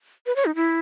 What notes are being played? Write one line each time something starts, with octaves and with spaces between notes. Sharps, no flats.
B4
C#5
D#4
E4